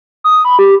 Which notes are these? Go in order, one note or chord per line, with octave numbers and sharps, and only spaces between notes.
D#6
B5
G4